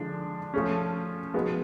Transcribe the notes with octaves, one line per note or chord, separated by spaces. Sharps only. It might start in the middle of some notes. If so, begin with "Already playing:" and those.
Already playing: D3 F3 G#3 D4
F3 A3 C#4
F3 G#3 B3 F#4